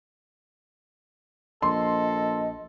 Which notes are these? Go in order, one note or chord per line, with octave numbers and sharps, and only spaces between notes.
A#1 A4 D#5 C6